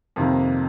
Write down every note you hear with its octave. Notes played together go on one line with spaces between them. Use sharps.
F2 C3 D#3 A#3